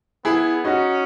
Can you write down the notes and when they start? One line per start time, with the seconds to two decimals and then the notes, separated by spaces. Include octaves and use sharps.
0.25 B3 E4 G#4
0.64 C#4 D#4 F#4